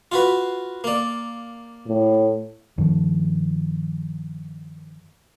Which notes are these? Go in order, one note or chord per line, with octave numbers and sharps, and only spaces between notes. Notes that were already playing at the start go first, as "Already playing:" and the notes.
F4 F#4 B4
A#3 D5
A2
G2 D#3 F3